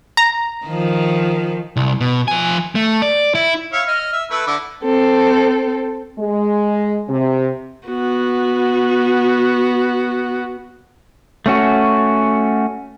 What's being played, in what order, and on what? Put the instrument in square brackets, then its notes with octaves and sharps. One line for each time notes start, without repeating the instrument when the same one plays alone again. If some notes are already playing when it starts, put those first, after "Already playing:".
[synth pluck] A#5
[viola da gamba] D#3 F3
[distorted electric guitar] C2
B2
F3 G#5
A3
D5
E4
[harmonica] E4 C#5 F5
D#5 F6
E5
A3 E4 B4
D3 E4 D6
[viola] C4 A4
[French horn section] G#3
C3
[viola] B3 F#4
[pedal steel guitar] A3 C#4 F#4